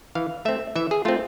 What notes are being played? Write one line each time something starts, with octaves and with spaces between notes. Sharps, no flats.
E3 F5
A3 C4 E5
E3 E5
G#4
A3 C4 F4